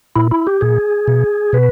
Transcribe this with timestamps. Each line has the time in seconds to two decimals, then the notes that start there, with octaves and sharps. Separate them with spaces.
0.16 A#2 E4
0.31 E4
0.47 G4
0.61 A#2 G#4
1.08 B2
1.53 B2 B4